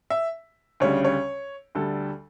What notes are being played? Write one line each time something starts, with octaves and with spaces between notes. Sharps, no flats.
E5
D2 C#3 G3 C#5
C#5
D2 D3 G3 A4